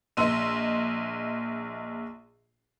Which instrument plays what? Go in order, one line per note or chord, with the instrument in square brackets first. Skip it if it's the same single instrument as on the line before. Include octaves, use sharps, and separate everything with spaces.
[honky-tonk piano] A#1 D#5 C6 E6 D#7